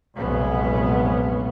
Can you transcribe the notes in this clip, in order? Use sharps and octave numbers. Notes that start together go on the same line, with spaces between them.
F1 B1 A#2 G#3 B3 C#4